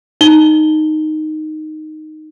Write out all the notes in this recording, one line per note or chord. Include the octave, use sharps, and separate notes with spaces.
D#4 G7